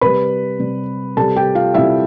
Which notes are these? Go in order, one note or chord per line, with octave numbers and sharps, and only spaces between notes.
C3 G3 B4 B5
C3 G3
C3 G3 A4 A5
G4 G5
F4 F5
C3 G3 E4 E5